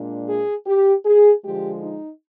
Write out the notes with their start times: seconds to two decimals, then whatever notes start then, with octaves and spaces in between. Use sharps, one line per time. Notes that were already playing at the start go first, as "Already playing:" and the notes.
Already playing: A#2 G#3 D4
0.27 G#4
0.66 G4
1.04 G#4
1.44 D3 F3 G#3 G4
1.82 D#4